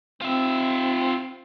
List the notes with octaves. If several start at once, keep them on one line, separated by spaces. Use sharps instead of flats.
C4 F4 E5